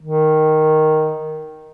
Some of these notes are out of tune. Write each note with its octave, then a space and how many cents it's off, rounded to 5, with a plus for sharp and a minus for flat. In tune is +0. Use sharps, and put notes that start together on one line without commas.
D#3 +0